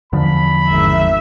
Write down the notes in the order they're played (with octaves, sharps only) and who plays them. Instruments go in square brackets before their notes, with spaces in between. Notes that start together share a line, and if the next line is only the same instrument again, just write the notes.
[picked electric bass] E2 D3 F3 [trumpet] B5
[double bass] G#1 [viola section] E5